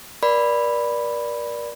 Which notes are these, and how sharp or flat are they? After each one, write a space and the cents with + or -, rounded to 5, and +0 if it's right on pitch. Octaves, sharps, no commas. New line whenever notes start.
A#4 +40 D5 +0 B5 +0